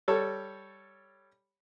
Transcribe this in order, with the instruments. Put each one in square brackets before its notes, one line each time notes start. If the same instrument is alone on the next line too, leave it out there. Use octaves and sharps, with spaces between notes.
[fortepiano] G3 A4 C#5